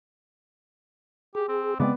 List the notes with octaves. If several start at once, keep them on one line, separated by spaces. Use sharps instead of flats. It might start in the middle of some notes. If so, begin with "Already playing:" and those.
G4 G#4
C4
C#3 G#3 B3 C4 D5